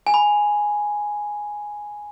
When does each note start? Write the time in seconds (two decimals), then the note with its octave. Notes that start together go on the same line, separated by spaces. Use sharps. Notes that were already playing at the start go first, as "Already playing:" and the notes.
0.07 G#5
0.14 B5